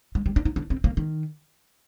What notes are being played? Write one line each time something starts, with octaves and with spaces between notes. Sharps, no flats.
G#3
G3
D4
D#4
D4
C4
A#3
D#3